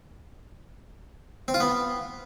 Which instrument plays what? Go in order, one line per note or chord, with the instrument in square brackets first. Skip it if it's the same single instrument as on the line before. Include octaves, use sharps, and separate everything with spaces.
[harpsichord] C4
F4
B3